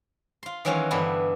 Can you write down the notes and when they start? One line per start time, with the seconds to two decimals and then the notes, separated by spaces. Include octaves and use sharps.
0.43 F4 C6
0.65 D#3 E3 F#3 G#3 C#4 F4
0.91 G2 D3 E3 B3 E4